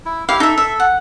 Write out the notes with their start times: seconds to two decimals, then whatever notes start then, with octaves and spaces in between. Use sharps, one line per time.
0.05 E4
0.29 E4 G4 F5
0.40 D#4 A4 E5
0.58 E5
0.80 F#5